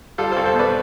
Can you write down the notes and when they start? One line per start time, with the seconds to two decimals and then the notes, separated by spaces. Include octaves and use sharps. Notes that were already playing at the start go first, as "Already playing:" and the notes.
0.18 G3 F4 A4
0.31 C2 A4 C5
0.46 A4 C5
0.54 B2
0.59 B4 D5